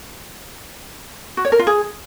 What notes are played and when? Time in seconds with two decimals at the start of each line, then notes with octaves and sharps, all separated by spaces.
1.37 F#4
1.45 C#5
1.52 A#4
1.59 F4
1.67 G#4